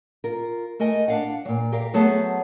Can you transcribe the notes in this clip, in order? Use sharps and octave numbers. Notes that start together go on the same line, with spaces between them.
F4 A#4
A3 A#4 D#5 G#5
D4 F5 F#5
A#2 F#3
G4 A#4 F5
F#3 A3 B3 G#4 C5 A5